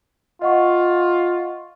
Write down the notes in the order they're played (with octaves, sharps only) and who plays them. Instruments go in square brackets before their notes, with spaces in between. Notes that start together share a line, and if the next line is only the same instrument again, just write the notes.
[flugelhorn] F4 [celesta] D#5 F#5 C#6